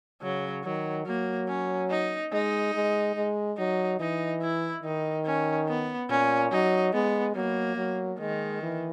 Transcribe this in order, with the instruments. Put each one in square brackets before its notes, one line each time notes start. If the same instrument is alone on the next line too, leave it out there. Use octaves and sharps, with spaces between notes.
[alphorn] C#3 [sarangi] F#3
[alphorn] D#3 [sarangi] F#3
[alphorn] F#3 [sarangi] A#3
[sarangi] C#4
D#4
[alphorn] G#3 [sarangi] D#4
[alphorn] G#3
G#3
[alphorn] F#3 [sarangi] D#4
[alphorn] E3 [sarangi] D#4
[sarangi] E4
[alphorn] D#3 [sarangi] D#4
[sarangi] C#4
B3
[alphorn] A#2 [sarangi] C#4
[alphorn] F#3 [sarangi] D#4
[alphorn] G#3 [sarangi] B3
[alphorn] F#3 [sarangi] A#3
[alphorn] F#3
[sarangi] D#3 [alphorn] G#3
[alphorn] E3